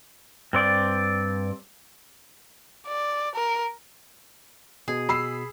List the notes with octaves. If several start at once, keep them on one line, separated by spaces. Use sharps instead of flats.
G2 C4 D5
D5
A#4
B2 G#4
B5 E6 C7